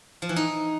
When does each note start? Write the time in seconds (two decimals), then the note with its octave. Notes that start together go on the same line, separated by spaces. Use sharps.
0.22 F3
0.29 E3
0.36 D#4